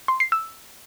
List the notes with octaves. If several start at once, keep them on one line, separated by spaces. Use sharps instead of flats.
C6
C7
E6